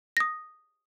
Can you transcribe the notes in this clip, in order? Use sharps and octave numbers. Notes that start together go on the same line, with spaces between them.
D#6 A#6